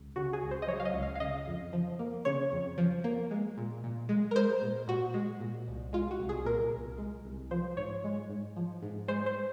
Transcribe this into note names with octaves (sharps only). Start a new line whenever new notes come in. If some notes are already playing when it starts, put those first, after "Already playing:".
Already playing: C#2
C#3 F#4
G#4
C#2
C5
D#5
F#3 C#5
F5
D#5
C#2
F5
F5
C#3 D#5
F2
F3
A#3
C#3 C#5
F2
F3
A#3
G#3
A#2
A#2
G#3
A#4
G#3 C5
A#2
A#2 F#4
G#3
A#2
C2
G#3 F4
F#4
C2
G#4
A#2 A#4
C2
G#3
C2
F3 C5
G#2 C#5
G#3
G#2
F3
G#2
G#3 C5
C5